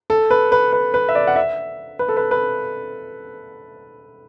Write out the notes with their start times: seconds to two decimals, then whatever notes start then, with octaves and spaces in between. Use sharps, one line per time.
0.10 A4
0.31 B4
0.52 B4
0.73 B4
0.94 B4
1.09 E5
1.15 D5
1.27 F#5
1.36 E5
1.99 B4
2.09 A4
2.17 B4
2.31 B4